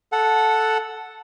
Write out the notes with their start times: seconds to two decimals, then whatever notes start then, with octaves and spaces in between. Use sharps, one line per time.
0.12 A4 F#5